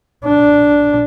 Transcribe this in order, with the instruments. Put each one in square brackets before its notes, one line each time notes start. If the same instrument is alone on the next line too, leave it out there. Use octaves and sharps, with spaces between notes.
[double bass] D4